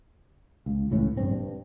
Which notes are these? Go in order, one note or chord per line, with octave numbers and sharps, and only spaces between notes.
C#2
C#2 A2 E3 C#4
A#1 G2 C4
G2